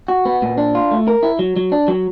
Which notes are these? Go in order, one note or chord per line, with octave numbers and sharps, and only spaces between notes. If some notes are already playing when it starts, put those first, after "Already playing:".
F#4
B3
A#2
D4
F4
A3
A#4
E4
F#3
F#3
D4
F#3